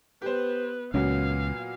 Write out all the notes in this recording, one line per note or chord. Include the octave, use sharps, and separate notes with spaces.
B3 G4 B4 C5
C#2 A#2 F#3 B3 C#4 F5